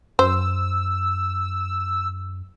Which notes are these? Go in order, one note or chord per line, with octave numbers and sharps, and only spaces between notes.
F#2 C5 E6